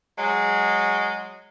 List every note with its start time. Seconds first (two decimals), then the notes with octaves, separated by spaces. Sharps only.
0.18 F#3 G#3